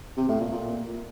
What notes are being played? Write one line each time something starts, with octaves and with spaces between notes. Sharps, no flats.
C3
A2
A#2
A#2